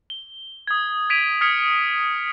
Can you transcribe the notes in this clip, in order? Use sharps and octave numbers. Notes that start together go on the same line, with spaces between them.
G7
D#6 G#6
G#6 B6 D7 D#7 F7
D#6 F6 G#6 B6 C#7 F7